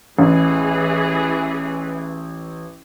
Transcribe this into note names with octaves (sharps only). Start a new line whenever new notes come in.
A1 E3 G#4